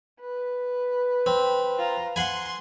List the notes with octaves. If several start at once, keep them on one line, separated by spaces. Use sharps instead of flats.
B4
C4
F4 A#5
F#5 G#5 C6